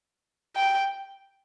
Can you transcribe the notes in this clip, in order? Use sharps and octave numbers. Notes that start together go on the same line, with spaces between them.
G5